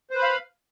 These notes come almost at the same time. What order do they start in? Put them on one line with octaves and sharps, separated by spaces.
C5 B4 B5 F5